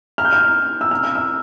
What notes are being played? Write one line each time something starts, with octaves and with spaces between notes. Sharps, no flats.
F6
G6
F6
E6
F6
F6
E6